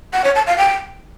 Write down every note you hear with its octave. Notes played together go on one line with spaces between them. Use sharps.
F#5
C#5
A5
F5
G5